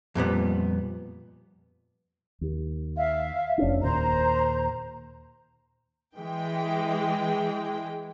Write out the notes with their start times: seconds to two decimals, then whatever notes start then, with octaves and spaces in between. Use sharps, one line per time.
0.15 F2 A#2 G3 B3
2.41 D#2
2.97 E5 F5
3.58 F1 C#4 D4
3.82 D#2 A#2 C5 A#5
6.18 E3 G#3 G5